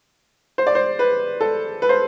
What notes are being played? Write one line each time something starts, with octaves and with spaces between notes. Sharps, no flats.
C5
D5
C5
B4
A4
B4
C5